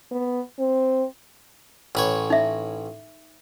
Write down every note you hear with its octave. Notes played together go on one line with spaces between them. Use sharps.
B3
C4
A1 B4 C#5
D#4 E5